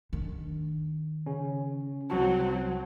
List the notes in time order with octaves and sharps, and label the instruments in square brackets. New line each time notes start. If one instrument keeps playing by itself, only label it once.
[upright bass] D#3 D4
[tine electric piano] C#3 C#4
[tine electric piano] C2 F#4 A5 [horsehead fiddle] F#3 C4